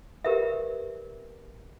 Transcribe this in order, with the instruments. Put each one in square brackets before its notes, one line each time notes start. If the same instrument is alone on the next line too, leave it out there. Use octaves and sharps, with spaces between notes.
[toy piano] G4 A#4 B4 D5 E5